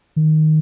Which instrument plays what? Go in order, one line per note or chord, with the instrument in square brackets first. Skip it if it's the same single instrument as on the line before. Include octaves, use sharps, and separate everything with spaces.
[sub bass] D#3